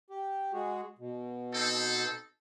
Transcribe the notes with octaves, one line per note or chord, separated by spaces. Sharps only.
G4
G#3 F#4 G#4
B2
C4 D#4 A4